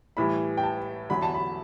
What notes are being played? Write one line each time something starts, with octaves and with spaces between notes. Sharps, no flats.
A2 E3 G3 B5
G5
A5
E2 D3 F#3 B5
A5
B5